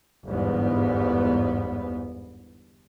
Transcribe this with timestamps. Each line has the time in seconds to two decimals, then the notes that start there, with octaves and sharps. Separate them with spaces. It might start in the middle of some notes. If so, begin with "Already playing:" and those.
0.25 G1 E2 G#2 B3